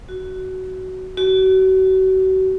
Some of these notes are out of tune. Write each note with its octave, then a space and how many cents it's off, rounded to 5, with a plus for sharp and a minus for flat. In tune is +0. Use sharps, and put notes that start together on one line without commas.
F#4 +15
F#4 +35